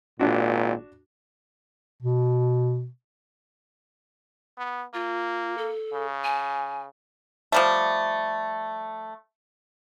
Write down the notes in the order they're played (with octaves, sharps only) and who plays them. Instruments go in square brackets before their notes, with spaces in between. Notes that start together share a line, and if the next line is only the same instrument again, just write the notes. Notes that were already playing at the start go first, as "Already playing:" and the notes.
[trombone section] G#1 A#2 [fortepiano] D4 F#4
[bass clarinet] B2
[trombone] B3
[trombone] A#3 [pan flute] F4
[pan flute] A4
[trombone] C#3
[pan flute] G#5
[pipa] F3 G3 A3